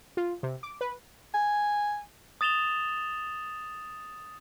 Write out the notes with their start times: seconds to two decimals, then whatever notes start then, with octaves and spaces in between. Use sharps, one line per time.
0.17 F4
0.43 C3
0.63 D6
0.81 B4
1.34 G#5
2.41 D#6 A6 E7 F7 G7